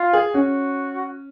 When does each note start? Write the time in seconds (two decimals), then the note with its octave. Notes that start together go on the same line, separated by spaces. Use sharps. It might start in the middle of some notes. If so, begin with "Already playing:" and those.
Already playing: F4
0.13 G#4
0.34 C#4 F#4